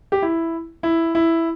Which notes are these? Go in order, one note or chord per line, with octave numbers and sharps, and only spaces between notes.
G4
E4
E4
E4